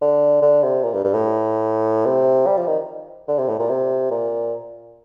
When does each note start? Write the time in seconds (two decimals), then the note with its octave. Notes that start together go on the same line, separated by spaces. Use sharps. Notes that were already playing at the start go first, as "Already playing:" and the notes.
0.01 D3
0.42 D3
0.63 C3
0.83 A#2
0.94 G2
1.04 G2
1.14 A2
2.06 C3
2.47 G3
2.57 F3
2.67 D#3
3.28 D3
3.39 C3
3.49 A2
3.59 A#2
3.70 C3
4.11 A#2